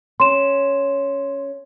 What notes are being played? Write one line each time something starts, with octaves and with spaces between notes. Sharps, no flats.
C#4 C6 E7